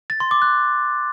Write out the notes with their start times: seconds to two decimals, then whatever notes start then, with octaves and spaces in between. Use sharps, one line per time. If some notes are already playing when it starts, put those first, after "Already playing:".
0.10 A6
0.20 C6
0.31 D6
0.42 F#6